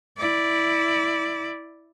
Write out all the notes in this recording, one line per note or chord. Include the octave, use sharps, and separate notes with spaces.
E4 D5